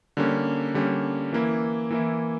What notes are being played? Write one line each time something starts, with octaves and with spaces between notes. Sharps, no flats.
D3 G3 A#3 C#4
D3 G3 A#3 C#4
E3 A#3 E4
E3 A#3 E4